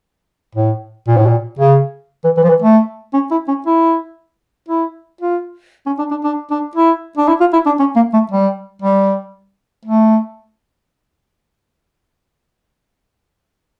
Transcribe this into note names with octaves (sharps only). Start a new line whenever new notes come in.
A2
A#2
A2
A#2
C#3
E3
E3
F3
E3
A3
C#4
E4
C#4
E4
E4
F4
C#4
D4
D4
D4
D4
E4
D4
E4
F4
E4
D4
C#4
A#3
A3
G3
G3
A3